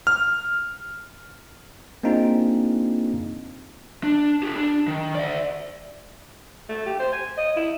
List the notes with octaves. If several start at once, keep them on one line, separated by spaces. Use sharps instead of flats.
F6
A#3 C4 D4 D#4 F4 G#4
D4
G4 A4
D4
D#3
D5 E5
A3
G4
C5
G#5
D#5
E4